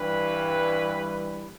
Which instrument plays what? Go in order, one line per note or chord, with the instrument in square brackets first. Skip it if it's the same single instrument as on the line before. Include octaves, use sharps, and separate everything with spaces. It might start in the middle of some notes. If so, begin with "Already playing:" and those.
Already playing: [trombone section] G2 E3 G3 B4